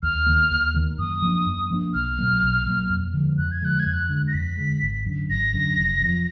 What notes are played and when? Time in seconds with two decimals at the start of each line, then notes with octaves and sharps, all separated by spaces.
0.03 D#2 F6
0.26 D#3 A#3
0.51 D#2
0.74 D#3 A#3
0.98 F#2 D#6
1.22 F3 A#3 D4
1.46 F#2
1.71 F3 A#3 D4
1.94 B1 F6
2.19 B2 F#3 A#3
2.42 B1
2.66 B2 F#3 A#3
2.89 F2
3.14 D3 F3 G#3
3.38 F2 F#6
3.51 G#6
3.62 D3 F3 G#3 F#6
3.79 G#6
3.86 F2
3.93 F#6
4.09 D3 G#3
4.28 A#6
4.33 F2 B6
4.57 D3 G#3
4.82 G#1
5.05 F#2 D3
5.29 G#1 A#6
5.53 F#2 D3
5.77 F1
6.01 F2 F3